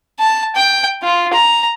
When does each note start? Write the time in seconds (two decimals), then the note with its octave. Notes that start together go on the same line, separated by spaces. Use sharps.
0.20 A5
0.56 G5
1.03 F4
1.33 A#5